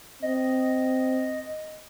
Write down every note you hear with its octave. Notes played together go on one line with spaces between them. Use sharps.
C4 D#5